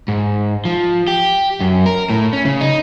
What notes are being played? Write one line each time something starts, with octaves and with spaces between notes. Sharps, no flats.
G#2
F3
G4
F#2
A#4
A2
C#4
C#3
D#4